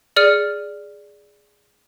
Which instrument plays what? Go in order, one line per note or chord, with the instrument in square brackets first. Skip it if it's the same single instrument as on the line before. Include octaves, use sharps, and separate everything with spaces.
[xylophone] G#4 D5 F6 C#7 D#7